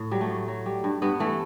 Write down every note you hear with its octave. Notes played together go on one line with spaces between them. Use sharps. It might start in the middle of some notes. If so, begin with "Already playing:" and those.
Already playing: A2
F#3 G3
A3
A2
F#3
G3
G2
G2 B3
E3 A3